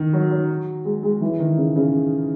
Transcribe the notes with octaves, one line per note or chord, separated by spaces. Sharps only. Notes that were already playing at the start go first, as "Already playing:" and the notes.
Already playing: D#3
F#3
F#3
G#3
G#3
E3
D#3
C#3
C#3